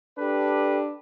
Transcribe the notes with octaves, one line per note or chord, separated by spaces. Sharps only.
D4 G4 A4 B4